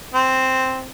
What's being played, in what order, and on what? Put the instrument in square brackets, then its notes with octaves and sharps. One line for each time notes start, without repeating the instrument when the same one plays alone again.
[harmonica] C4